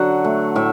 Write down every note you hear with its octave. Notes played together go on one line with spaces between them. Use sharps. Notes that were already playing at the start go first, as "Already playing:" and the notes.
Already playing: D3 F#3 F#5
A3
A2 E5